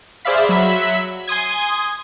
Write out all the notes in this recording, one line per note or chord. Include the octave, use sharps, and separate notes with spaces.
G#4 C5 D5 E5 F5 B5
F#3 E5 B5
G#5 C6 D#6 G#6